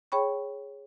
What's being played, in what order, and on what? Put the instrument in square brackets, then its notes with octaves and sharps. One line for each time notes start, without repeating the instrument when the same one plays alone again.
[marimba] G#4 C#5 G5 B5 C#6